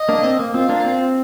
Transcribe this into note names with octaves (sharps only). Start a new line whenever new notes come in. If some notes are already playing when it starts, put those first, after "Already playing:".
Already playing: D#5
A#3 D4
C4
A#3
C4 F4
A#3 D4
C4